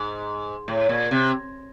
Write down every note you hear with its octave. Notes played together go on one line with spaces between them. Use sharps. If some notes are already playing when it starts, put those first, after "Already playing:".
Already playing: G#2
A2
A#2
C3